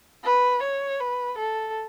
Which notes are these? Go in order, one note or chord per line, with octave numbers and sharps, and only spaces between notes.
B4
C#5
B4
A4